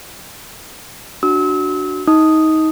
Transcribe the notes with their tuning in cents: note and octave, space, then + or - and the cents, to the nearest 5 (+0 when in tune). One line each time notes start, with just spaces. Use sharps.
D4 +0 F#4 +0 E6 -40
D#4 +25 D#6 +0